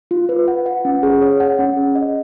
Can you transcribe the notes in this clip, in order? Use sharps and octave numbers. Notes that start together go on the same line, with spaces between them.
F4
B4
F#5
F#5
C#4
G#4
C#5
F#5
C#4
G#4
D#5